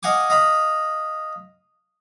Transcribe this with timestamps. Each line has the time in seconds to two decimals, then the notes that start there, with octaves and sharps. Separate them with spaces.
0.03 D#5 F5 F#5 G#5 D6
0.30 D#5 F5 A#5 B5